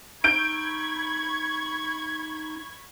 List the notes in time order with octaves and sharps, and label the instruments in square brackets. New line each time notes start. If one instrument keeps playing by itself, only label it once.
[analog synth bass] D#4 [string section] B5 C#6 G#6 [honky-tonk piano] G6 D7